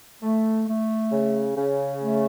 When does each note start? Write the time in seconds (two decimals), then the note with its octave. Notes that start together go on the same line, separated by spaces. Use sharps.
0.23 A3
0.68 A3
1.12 C#3
1.57 C#3
2.01 A3